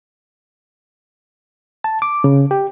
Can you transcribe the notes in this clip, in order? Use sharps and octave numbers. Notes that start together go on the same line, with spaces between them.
A5
D6
C#3
G4